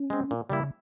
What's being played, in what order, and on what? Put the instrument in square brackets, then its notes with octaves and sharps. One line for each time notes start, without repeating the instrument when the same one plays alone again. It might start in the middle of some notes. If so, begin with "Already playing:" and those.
Already playing: [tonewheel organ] C#4
[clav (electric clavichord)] G#3 C4
A#2
[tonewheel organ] C#3 [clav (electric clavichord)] G3 A#3 E4